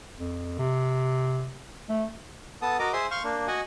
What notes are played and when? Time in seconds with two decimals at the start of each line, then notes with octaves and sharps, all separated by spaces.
0.17 F2
0.59 C3
1.89 A3
2.62 B3 A4 A5 D#6
2.79 F#4 A#4 D#5 A#5 D6
2.93 G#4 C5 E5 C6 D#6
3.11 F5 C6 C#6 F6 G6
3.24 A#3 D4
3.48 F#4 D#5 F#5 G#5